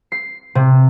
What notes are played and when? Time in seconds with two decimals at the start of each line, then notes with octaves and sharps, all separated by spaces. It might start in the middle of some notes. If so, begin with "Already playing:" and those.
0.12 C7
0.55 C3